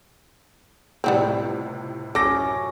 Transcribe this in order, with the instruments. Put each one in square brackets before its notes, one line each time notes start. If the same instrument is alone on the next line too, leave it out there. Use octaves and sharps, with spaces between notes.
[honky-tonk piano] C#2 A2 C3 [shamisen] G3 B3 C4
[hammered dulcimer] F#2 C#4 [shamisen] A4 [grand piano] D6 A#6